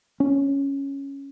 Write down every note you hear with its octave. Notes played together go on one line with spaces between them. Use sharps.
C#4